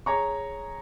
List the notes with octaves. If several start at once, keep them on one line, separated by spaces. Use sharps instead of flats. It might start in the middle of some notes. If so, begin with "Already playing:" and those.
G#4 C#5 A#5 C#6